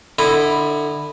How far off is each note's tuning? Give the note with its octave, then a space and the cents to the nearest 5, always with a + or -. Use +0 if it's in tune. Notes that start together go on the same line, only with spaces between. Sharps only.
D3 +20 E4 +0 D#5 -20